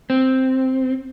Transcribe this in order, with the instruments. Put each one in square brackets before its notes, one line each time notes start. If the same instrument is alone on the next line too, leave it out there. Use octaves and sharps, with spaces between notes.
[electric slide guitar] C4